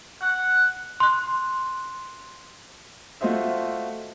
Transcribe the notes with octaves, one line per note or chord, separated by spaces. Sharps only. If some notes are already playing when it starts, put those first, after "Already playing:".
F#5
C6 F#6
A3 F4 F#4 C5 D#5 E5